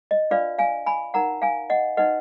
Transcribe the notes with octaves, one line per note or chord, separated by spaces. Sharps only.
D#5
D4 F4 B4 D5 F5
F5 G#5
G#5 B5
D#4 A#4 F#5 A#5
F5 G#5
D#5 F#5
D#4 F#4 B4 D#5 F#5